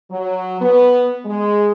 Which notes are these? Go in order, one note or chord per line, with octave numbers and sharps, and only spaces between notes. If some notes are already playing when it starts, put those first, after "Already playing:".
F#3
B3
G#3